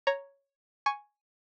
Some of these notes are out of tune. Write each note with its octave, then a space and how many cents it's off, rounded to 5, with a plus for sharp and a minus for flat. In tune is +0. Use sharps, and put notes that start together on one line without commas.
C#5 +0 A#5 +0
G#5 +0 C#6 +0